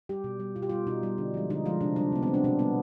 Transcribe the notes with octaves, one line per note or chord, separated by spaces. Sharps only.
G3 G4
B2
G3
B2 F4
G4
G3 F4
B2 D#4
G3
D3
F3 G#3
D3 D#4
F3 G#3 F4
C3 D4
G3 D4
C3 B3
G3 C4
D4
B2 D4
G3 B3